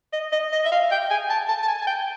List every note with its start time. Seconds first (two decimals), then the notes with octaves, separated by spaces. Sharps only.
0.13 D#5
0.32 D#5
0.52 D#5
0.65 E5
0.71 F5
0.91 G5
1.10 G#5
1.30 A5
1.48 A5
1.63 A5
1.68 G#5
1.81 G#5
1.87 G5